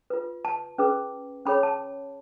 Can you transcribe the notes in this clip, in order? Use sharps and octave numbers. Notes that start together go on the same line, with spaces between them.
F4 B4
A5
C#4 G#4 B4
C#4 G#4 C#5 B5
A5